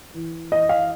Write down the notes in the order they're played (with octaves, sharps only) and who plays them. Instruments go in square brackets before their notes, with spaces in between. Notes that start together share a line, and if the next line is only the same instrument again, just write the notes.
[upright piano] E3
E3 D#5
F5